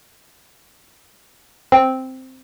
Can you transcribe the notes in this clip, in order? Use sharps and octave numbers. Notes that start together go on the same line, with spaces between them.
C4